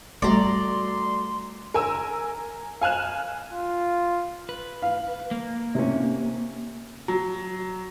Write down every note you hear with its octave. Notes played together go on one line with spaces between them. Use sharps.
G3 A3 F#4 D5 A#5 C6
A#4 G#5 E6
F5 G#5 F6 F#6 E7
F4
B4
F5
A#3
C3 C#4
F#3